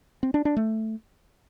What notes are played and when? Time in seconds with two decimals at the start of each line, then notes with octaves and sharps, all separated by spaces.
0.23 C4
0.34 D4
0.45 D4
0.57 A3